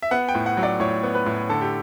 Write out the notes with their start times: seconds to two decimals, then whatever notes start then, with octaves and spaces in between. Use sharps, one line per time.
0.02 E5
0.11 B3 F#5
0.29 G5
0.35 A2
0.46 F#5
0.57 F#3
0.63 D5
0.80 A2 C#5
1.03 B3
1.15 B4
1.26 A2
1.49 D3 A4
1.61 G4